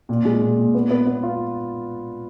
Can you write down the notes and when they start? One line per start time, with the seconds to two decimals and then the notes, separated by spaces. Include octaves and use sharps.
0.09 A#2
0.25 G#3
0.42 A#2
0.58 A#2
0.74 B3
0.91 B3
1.07 B3
1.23 F4